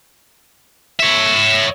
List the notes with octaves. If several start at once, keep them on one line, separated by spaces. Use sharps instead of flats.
C#5 E5